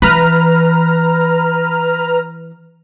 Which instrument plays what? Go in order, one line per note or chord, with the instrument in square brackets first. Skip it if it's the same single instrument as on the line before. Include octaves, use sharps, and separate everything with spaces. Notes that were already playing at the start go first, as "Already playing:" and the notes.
[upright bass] E3 [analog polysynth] B4 A#5 F6